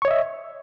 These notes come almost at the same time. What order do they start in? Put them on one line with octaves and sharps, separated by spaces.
C#6 C#5 D#5 E5